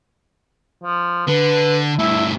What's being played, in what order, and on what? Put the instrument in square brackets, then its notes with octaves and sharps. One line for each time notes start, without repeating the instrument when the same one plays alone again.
[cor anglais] F3
[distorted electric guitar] D3 [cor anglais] B4
[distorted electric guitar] G2 A3 [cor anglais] E4